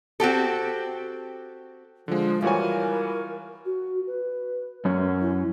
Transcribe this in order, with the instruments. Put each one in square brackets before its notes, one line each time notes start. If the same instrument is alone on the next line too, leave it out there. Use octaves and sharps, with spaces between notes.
[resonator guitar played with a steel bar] C4 F#4 G4 A4
[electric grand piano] D3 G#3 [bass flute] F3
[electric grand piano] E3 G3 F#4 [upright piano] F4 C#5 G#5 [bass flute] A#4
[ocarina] F#4
B4
[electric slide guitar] F#2 C#4
[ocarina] E4